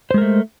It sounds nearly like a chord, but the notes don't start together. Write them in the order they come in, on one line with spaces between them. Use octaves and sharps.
C5 G#3 A#4 A3